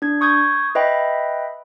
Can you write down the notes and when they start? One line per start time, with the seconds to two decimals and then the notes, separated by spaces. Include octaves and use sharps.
0.02 D4 G#6
0.21 C#6 D#6 G6 G#6
0.75 B4 D#5 E5 G5 B5